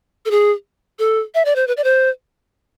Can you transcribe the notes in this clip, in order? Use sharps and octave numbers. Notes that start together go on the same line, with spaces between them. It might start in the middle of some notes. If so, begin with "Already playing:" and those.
A4
G#4
A4
E5
D5
C5
B4
D5
C5